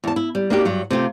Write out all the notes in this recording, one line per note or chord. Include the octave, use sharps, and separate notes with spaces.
E2 A5
E4
G3
A#3 D4 D#4 F#4 G4
G2 F#3
C3 A3 F4 G4